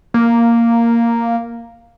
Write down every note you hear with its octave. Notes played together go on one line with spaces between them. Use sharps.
A#3